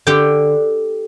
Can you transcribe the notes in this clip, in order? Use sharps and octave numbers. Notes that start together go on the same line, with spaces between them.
D3 G4 G5